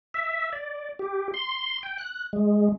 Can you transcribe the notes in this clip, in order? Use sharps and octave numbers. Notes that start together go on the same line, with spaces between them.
E5
D5
G4
C6
G5
F#6
G#3